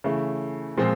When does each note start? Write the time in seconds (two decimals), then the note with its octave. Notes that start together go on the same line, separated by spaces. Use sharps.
0.04 C#3 E3 A3
0.77 A#2 F3 G#3 C4